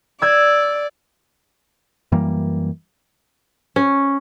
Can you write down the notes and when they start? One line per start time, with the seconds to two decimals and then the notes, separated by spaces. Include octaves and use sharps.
0.22 D5 E6 G#6
2.12 F#2 E3 G3 A#3
3.76 C#4